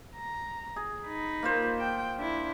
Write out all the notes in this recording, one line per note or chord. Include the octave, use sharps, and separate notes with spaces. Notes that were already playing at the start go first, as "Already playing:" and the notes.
A#5
G#4
D#4 B5
A#3 F4 C5
G5
D4 E4